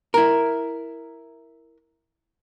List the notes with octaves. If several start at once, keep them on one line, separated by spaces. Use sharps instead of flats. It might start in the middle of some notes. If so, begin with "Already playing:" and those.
E4 A#4